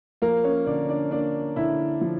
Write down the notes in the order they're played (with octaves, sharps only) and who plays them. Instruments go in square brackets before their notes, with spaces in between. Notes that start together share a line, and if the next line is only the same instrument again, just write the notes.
[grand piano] F3 A#3 A#4
C#4 C#5
D3 D4 D5
D4 D5
A#3 D4 D5
D3 E4 E5
F3